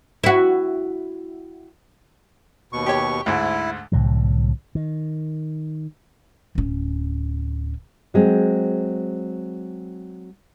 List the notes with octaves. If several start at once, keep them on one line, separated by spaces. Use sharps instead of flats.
E4 F#4
D#2 B2 C#6
G4 C#5
D2 G#2 E4
C2 A2 D3 F#3
D#3
D1 C#4
F#3 G#3 C4